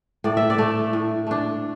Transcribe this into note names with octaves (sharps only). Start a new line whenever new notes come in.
A2 D5
E5
D5
A3 D4
A2
A3 D4